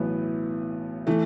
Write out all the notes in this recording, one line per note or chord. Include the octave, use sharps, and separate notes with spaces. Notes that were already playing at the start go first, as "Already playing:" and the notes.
Already playing: B1 A2 E3 B3
E3 A3